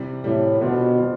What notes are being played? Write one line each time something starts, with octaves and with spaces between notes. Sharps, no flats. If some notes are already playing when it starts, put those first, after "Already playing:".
Already playing: C3 E3 G3
A2 C3 E3 G3
B2 D3 G3 C4 F4
D3 G3 C4 F4